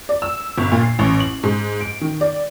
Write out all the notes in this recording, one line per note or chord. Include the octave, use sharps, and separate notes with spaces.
D5
E6
G1
A#2
C7
A1
F#7
G#2
D7
D#3
D5